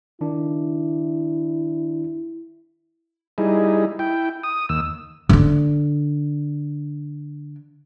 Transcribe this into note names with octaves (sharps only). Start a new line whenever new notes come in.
D#3 D4 E4
G3 D#4 E4 G#4
E4 G5
D#6
D#2 E6
D3 D4